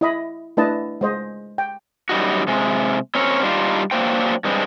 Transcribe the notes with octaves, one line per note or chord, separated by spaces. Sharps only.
E4 D#5 B5
A3 D4 E4 B4 D#5 A5
G#3 C5 D#5
G5
F#2 G3 D#4 F#4
C3 G#3
C4 C#4 A#4 C#5
G3 D4 D#4 F4
F#3 A#3 D4 C5 G5
G2 G#3 C4